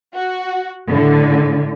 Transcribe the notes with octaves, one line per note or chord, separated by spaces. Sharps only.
F#4
A2 D3